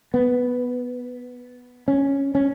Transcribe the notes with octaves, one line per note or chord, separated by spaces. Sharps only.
B3
C#4
C#4